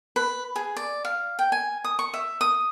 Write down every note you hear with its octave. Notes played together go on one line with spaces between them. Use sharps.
B4
G#4
D5
F5
G5
G#5
D#6
C#6
E5
D#6